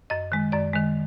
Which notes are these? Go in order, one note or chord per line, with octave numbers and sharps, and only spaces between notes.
F#2 D#5
D#3 G#3
F#2 D5
D#3 G#3